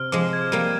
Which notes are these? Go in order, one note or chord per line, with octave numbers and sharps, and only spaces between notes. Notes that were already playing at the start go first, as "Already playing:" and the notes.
Already playing: C3 F6
F3 G#3 D6
G#6
G3 A#3 D#7